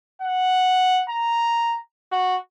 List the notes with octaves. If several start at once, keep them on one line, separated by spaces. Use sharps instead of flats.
F#5
A#5
F#4